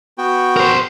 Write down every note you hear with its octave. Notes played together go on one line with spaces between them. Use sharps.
B3 F#4 G5
A#4 C5